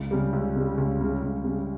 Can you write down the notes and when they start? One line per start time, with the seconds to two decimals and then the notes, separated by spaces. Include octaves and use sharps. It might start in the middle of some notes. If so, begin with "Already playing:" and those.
Already playing: C#2
0.11 C#3 G3
0.33 C#2
0.56 C#3 G3
0.78 C#2
1.00 C#3 G3
1.22 C#2
1.44 C#3 G3